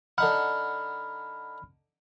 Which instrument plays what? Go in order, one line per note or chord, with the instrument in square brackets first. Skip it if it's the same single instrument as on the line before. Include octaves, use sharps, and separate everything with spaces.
[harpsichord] D3 D#4 F#5 [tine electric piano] B5 F6